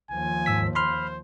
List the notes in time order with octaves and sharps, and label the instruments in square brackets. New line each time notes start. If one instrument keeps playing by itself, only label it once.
[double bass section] D#2 F3 [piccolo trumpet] G#5
[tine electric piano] G#2 E6 B6
[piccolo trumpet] C5 [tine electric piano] B5 C6 F6